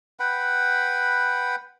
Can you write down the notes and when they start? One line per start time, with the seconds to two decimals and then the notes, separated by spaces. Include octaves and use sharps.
0.20 B4 F#5 G5 B5